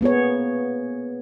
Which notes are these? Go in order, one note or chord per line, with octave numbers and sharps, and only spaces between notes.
A#3 B3 G#4 C#5